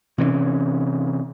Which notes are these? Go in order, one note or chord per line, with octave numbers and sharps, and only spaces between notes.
C3 E3 C4 C#4